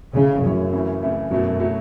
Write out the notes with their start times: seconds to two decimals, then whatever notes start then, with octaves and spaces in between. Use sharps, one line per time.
0.14 C#3 A3 E4 C#5
0.43 F#2 A3 E4 C#5
0.73 C#3 E3 A3 E4
1.02 C#3 E3 A3 E4
1.31 F#2 B2 F#3 A3 E4
1.60 B2 F#3 A3 E4